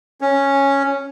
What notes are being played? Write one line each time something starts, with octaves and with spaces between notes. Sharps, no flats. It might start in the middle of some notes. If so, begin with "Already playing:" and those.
C#4